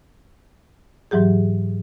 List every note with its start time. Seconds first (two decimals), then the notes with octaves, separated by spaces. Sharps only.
1.11 G#2 E3 F#3 G4 G#4